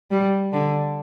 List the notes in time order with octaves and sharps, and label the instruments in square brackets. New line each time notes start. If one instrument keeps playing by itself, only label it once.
[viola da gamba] G3
D3